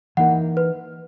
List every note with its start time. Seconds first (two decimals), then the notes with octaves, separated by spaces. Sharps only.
0.17 E3 A#3 D#4 A#4 F#5
0.57 B4